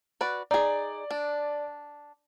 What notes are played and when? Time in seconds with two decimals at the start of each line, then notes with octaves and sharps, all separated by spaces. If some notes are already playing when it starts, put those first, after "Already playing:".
0.21 F#4 B4 D5
0.51 D#4 G#4 D5
1.11 D4